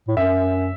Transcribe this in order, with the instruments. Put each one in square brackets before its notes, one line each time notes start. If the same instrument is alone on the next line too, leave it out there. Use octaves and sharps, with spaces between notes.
[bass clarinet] A2
[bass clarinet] F#2 [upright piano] E5